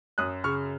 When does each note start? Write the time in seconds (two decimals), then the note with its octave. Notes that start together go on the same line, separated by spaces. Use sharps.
0.18 F#2 D#6 F#6
0.44 C#3 C#6 F6